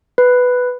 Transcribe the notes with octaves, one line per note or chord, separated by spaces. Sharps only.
B4